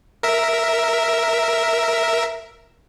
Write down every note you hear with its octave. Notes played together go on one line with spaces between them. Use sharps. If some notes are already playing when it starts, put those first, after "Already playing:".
A#4 E5